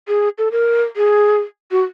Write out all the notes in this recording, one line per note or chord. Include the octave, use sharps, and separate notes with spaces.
G#4
A4
A#4
G#4
F#4